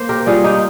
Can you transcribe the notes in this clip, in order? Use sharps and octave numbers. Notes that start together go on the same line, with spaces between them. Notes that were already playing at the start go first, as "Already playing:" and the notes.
Already playing: A#3 C5
G4 A#4
G3 F4 G#4
D#4 G4